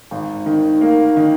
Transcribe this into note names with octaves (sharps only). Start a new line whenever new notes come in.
G#1
D#3
A#3
D#3